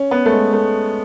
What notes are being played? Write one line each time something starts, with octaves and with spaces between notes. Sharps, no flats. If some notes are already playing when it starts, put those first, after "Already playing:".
Already playing: C#4
B3
A3
G#3
A3